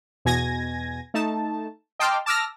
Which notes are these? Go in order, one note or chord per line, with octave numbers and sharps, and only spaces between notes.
E2 B2 G#5 G#6 A#6
A3 D#4 A5
D#5 G5 A5 C6 D6 F6
A5 D6 E6 F6 A#6